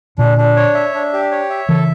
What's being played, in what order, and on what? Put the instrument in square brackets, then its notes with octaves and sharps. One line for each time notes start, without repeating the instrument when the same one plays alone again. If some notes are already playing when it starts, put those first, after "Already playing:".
[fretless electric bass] A#2 D3 [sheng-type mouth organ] D4
[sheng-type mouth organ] D4
C#5
E5
D4
G4
C#5
E5
[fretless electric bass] C#3 E3 [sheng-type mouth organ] A4